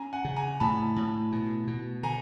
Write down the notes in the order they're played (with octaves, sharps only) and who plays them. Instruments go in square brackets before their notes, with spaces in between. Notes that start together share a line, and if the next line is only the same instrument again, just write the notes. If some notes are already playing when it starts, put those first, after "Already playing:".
Already playing: [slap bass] C#4 [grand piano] G#5 A#5
[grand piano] F#5 G#5
[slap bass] C#3
[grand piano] G#5 A#5
[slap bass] A2 [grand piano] A5 B5
[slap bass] A2
B2
B2
[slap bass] D3 [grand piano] G#5 A#5